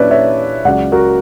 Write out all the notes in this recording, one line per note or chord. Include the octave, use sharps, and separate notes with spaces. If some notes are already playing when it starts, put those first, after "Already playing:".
Already playing: A#2 F#3 C#4 D4 E4 B4 D5
C#5 E5
C#2 C#3 F#3 D5 F#5
F#4 A#4